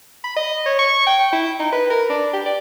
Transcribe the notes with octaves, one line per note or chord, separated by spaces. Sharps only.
B5
D#5
C#5
C#6
G5
E4
D#4
B4
A#4
D4
G4
D5